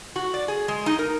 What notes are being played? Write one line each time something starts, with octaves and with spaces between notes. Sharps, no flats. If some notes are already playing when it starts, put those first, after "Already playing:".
F#4
D5
G#4
G#3
D#4
A#4